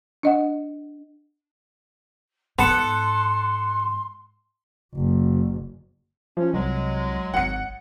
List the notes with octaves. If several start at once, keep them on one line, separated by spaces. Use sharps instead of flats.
D4 D#5 F#5
G#2 B3 A4 F#5 A5 C6
F#1
F3 C#4
C2 F#3 G#3
G#1 F#5 C#7